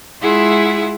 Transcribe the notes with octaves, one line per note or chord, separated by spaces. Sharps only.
G#3 E4 F4 G#4 E5 F#5